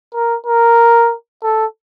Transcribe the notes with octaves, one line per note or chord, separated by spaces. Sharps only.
A#4
A#4
A4